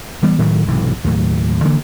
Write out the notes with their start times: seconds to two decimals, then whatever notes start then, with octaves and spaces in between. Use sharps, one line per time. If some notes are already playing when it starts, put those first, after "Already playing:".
0.23 E3 G3 B3
0.39 A2 D#3 F#3
0.68 B1 G#2 C3 E3
1.04 D#2 A2 F#3
1.64 D3 E3 A#3